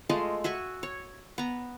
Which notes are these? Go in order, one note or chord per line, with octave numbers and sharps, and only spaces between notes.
G#3 A3 F4 D#5
F#4 E5 G#5 C#6
C#5
B3 A#5